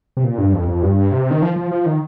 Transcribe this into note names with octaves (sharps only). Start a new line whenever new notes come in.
C3
A#2
G2
F2
F2
G2
C3
D#3
F3
F3
F3
D#3